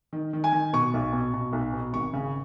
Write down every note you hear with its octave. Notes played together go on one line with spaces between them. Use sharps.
D#3
D#3
G#5
D#3
B2 C#6
B1
B2
B2
B1
B2
G#1 C#6
C#3